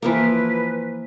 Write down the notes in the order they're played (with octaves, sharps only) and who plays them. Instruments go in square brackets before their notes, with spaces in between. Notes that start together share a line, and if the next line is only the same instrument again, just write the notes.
[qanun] E3 F3 A#3 [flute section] B4